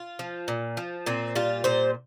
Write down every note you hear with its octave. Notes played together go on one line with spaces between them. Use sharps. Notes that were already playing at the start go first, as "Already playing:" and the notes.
Already playing: F4
F3
A#2
F3
A#2 C4
G3 F4
A#2 C5